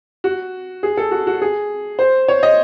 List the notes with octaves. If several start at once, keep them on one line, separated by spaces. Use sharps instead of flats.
F#4
G#4
A4
F#4
F#4
G#4
C5
C#5
D#5